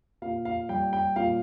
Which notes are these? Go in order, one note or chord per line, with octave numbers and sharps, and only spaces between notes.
A#2 F5
F5
G3 G5
G5
A#2 F5